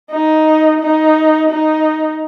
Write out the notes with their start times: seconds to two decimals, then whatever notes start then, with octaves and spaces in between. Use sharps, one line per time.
0.11 D#4
0.80 D#4
1.49 D#4